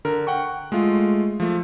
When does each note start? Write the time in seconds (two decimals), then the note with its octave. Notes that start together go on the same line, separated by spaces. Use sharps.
0.05 D3 A#4
0.27 F#5 G5 C#6
0.72 G#3 A3 F4
1.40 F3 A3